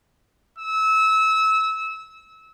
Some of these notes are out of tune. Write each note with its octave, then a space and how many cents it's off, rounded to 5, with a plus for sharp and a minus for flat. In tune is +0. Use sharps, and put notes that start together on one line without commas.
E6 -25